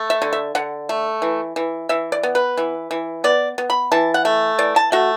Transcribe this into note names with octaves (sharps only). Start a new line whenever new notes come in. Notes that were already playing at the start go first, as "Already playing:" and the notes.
Already playing: A3
E5
D3
E5
D3 F#5
A3
E3
E3
E3 E5
D5
B3
B4
E3
E3
B3 D5
B3
B5
E3 A5
F#5
A3
E3 D5
A5
A3 F#4